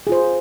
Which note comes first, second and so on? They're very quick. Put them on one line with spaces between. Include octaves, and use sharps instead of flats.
G#4 F4 C5